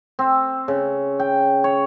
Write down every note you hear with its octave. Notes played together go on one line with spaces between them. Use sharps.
C4
C#3
G5
C#5